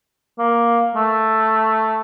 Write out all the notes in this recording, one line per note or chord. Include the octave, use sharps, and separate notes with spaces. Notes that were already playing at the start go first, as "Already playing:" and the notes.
A#3
A3